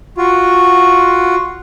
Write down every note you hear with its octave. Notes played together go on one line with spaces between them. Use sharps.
F4 F#4